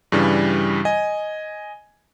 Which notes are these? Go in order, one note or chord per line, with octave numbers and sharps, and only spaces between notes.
G2 C#3 E3 G3
D#5 G#5